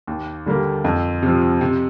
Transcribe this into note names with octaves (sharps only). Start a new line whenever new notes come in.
D#2
D3 G3 A#3
F2
C3 F3
C3